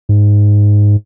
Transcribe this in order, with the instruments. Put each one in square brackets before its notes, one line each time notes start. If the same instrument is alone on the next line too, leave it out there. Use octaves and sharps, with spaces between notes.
[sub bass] G#2